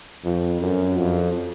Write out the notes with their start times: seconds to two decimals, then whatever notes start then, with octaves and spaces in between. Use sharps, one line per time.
0.24 F2
0.60 F#2
0.96 F2